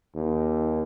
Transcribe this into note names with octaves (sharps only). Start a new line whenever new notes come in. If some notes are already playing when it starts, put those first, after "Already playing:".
D#2